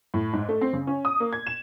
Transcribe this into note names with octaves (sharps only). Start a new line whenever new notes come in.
A2
G#2
A3
C4
C#3
C#4
D#6
A#3
G#6
E7